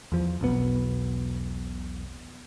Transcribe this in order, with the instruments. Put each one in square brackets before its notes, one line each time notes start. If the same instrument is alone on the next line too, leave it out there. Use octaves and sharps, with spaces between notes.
[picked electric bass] E2 F3
E1 B1 B3